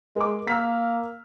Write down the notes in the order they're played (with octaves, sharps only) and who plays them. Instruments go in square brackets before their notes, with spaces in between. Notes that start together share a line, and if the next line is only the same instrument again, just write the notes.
[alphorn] G#3 [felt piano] A#4 D6
[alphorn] A#3 [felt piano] E6 F6 B6